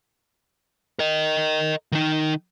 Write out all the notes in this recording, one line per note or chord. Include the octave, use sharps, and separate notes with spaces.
A#4 D#5
D#3 D#4